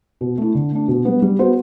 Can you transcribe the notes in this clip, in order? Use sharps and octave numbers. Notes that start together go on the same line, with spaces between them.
B2
A3 E4
D3
A3 D4
B2
G3 B3
G3
B3 F#4 C5